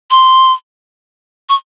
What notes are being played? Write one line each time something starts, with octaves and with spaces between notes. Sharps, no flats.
C6
C#6